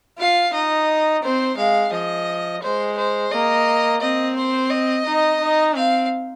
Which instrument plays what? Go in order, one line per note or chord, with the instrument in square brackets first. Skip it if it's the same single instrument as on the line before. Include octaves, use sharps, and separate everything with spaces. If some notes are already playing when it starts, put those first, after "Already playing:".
[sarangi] F4 [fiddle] F5
[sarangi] D#4 [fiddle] D#5
[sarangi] C4 [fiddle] C5
[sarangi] G#3 [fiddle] F5
[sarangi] F3 [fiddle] D#5
[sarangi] G#3 [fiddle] C5
[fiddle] C5
[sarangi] A#3 [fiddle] D#5
[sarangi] C4 [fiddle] D#5
[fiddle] C5
D#5
[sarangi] D#4
D#4
[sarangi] C4 [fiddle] F5